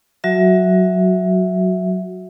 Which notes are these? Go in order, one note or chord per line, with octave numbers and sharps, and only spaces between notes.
F#3 F#4 E5